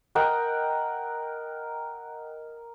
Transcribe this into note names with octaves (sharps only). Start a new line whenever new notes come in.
A#4 D#5 F#5 G5